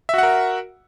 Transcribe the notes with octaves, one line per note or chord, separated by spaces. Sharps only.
F#4 A#4 E5 F#5